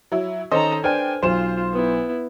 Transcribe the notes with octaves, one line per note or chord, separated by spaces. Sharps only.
F#3 E4
D#3 C#4 A4 C5 D#5 A#5
D4 B4 C5 G5 G#5 F6
B1 F4 C5 E7
B3 E4